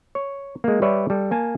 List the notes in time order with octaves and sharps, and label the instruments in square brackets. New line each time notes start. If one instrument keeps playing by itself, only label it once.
[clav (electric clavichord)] C#5
G#3 A#3
G3 B4 C#5 D5 E5
G3 A4
A#3 G#5 A5